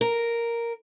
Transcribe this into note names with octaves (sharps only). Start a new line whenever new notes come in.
A#4